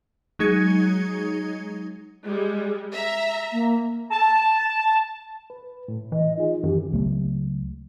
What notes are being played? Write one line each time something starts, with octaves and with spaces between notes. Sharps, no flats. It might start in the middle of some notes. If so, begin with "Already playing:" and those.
F#3 G#3 D#4 G#4 G#6 C#7
G3 G#3
E5 A#5
A#3
A5
B4
A2
E3 D#5
D#4 F4 G#4
F#2 D#3 E3 G4
C#2 F#3 A3 B3